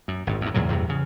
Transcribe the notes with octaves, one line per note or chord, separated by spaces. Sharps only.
F#2
G#1 G2
E2 G2
E2 A#2 C#3 F#3
E2 G2 C3
C#3